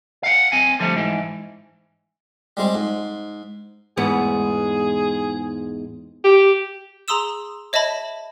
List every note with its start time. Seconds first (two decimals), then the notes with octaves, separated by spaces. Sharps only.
0.23 F5 F#5
0.52 C4 G#5
0.79 D3 F3 G3 A3
0.97 G#2 E3
2.57 G3 G#3 C4
2.75 G#2
3.97 E2 G#2 B3 G#4
6.24 G4
7.08 G#4 A#5 C6 D#6 E6 E7
7.73 C#5 D#5 E5 A5 B5